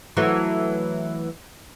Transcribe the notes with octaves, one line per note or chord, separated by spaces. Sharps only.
E3 F#3 A3